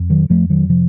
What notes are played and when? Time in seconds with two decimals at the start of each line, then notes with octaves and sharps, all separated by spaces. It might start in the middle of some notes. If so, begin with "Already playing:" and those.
Already playing: F2
0.10 D#3 F#3
0.29 F2 F3 A3
0.50 D#3 F#3
0.69 C3 F3